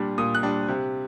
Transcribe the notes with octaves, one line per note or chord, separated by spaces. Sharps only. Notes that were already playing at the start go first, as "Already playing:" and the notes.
Already playing: A#2 G3 D4
A#2 D#6
F#6
G3 D4
C3